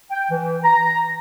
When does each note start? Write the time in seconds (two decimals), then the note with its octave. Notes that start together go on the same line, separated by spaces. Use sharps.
0.11 G5
0.31 E3
0.63 A#5